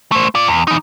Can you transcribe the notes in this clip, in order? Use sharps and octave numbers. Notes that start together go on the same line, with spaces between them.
A3 C5
F4 D5
E2
E3 D#4